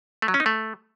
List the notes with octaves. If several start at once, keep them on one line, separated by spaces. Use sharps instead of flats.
A3
F#3
C#4
D#4
A3